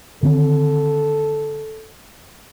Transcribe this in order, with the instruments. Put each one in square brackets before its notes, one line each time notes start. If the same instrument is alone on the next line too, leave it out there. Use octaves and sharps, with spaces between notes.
[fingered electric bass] D3 D#3 C4 [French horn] A4